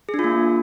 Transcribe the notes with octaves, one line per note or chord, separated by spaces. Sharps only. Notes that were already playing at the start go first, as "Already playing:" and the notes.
G#4
D4
F4
A#3